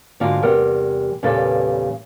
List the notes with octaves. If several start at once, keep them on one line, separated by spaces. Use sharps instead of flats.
G#2 D3 A#3 F4 F#4 F5
E2 C3 G3 A#4 F#5
E2 A#2 C#3 G3 A4 B4